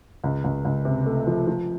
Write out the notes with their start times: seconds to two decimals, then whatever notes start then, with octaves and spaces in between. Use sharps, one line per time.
0.24 C#2
0.44 C#2
0.65 C#2
0.85 C3
1.06 A3
1.27 F3
1.47 F3